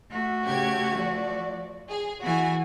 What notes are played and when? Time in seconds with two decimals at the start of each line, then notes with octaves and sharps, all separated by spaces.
0.11 A3 F#4
0.47 C#3 G4 G#6
0.97 F3 D5
1.89 G#4
2.23 E3 F#4 G#5